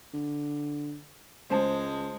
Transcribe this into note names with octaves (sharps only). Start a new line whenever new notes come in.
D3
C#2 G#3 C5 A5